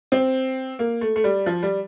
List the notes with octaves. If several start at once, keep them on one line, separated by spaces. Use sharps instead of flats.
C4
A#3
A3
A3
G3
F3
G3